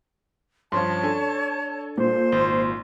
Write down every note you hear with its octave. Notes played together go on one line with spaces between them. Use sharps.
G2 F3 C#4 C#5 A5 C6
D4 A4 G#5
A#2 C5
G#1 C6